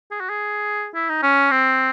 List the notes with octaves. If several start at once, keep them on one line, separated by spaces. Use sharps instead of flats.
G#4
F#4
G#4
E4
D#4
C#4
C4